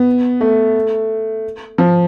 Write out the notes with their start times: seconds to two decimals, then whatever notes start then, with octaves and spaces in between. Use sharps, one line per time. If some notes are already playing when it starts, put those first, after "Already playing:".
Already playing: B3
0.41 A3
1.78 F3